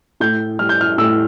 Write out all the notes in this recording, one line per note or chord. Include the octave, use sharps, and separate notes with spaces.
A2 G6
G3 F6
G6
F6
A2 E6